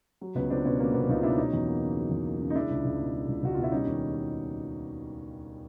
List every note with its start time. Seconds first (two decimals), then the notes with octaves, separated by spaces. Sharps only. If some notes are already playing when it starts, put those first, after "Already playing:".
0.21 F#3
0.35 C#2 B3 C#4
0.50 C#2 C4 D4
0.65 B2 B3 C#4
0.79 F#3 A#3 C4
0.94 C#2 B3
1.09 C#2 D#4 F4
1.23 B2 D4 E4
1.38 F#3 C#4 D#4
1.53 E2
1.68 A#3
1.82 C#3
1.97 F#3
2.11 E2
2.26 A#3
2.41 C#3
2.50 D#4
2.55 G#3 D4 E4
2.70 C#2
2.85 C#2
2.99 B2
3.14 G#3
3.28 C#2
3.43 C#2 F#4
3.54 B2 F4
3.63 E4
3.72 G3 C#4 D#4
3.87 D#2